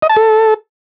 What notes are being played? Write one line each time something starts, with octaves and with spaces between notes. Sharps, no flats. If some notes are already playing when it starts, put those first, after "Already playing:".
D#5
A5
A4